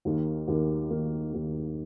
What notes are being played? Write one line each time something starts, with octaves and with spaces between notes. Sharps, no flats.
D#2 D#3 A#3
D#2 D#3 A#3
D#2 D#3 A#3
D#2 D#3 A#3